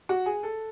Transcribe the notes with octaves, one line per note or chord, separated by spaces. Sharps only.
F#4
G#4
A4